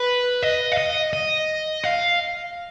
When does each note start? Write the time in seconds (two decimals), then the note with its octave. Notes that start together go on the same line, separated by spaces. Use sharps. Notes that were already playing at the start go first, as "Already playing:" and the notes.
Already playing: B4
0.43 D#5
0.72 F5
0.78 D#5
1.13 D#5
1.84 F5